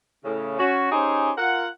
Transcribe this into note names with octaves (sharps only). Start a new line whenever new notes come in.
A2 C#3
C#4 F#4
C#4 D#4 G4 G#4 C5
F4 A#4 F#5